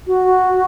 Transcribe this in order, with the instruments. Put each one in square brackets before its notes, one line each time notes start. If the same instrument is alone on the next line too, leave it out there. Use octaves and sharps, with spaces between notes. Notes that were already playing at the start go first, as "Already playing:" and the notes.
[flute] F#4